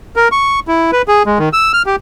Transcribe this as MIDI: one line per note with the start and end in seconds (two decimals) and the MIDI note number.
0.16 0.28 70
0.32 0.60 85
0.68 0.91 64
0.92 1.02 71
1.08 1.23 68
1.26 1.38 56
1.39 1.49 51
1.53 1.72 88
1.73 1.82 89
1.86 1.96 67